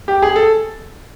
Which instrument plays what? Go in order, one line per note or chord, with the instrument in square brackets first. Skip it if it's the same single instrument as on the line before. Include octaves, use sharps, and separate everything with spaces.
[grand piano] G4
G#4
A4